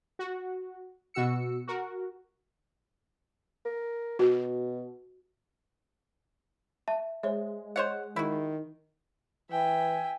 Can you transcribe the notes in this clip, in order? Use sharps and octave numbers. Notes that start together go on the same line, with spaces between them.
F#4
B2 F#4 E6 C#7
F#4 A#4
A#4
B2 F#4
E5 A5
G#3 C5 C#5 E5
C5 C#5 D#5 F#5
D#3 E4 F#4
E3 E5 G5 G#5